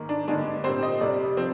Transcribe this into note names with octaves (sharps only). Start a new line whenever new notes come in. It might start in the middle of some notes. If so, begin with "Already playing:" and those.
Already playing: G#2 D#3 A#3
D4
G2 D3 G#3 D4
A#2 G3 C4 C5
D#5
F2 C3 G3 D5
F3 C4